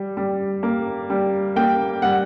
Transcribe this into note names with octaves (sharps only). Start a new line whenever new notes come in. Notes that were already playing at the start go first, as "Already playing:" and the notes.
Already playing: G3
G3
A#3
G3
A#3 G5
G3 F#5